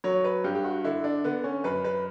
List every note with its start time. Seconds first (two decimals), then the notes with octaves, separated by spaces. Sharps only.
0.04 F#3 C#5
0.24 B4
0.44 G2 G4
0.55 G4
0.64 F#4
0.84 D3 E4
1.04 D4
1.24 D3 B3
1.44 C#4
1.64 F#2 B4
1.84 B4